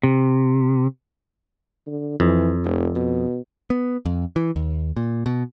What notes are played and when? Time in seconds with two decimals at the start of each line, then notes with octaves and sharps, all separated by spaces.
0.03 C3
1.87 D3
2.20 F2 E3
2.64 F1
2.95 B2
3.70 B3
4.06 F2
4.36 E3
4.56 D#2
4.96 A#2
5.26 B2